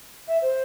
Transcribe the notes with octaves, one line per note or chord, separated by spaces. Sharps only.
E5
C5